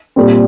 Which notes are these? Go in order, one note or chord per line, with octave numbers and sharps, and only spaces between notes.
A#2 G3 C4